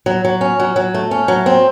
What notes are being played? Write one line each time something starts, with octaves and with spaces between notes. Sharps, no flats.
F#3
F#3
C#4
F#3
F#3
A3
C#4
F#3
C4